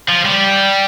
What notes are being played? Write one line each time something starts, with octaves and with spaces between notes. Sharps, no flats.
F3
G3